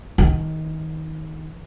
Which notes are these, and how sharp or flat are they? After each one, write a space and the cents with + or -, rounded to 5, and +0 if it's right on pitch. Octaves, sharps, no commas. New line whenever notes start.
D#3 +20